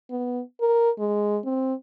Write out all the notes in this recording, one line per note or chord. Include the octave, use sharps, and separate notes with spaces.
B3
A#4
G#3
C4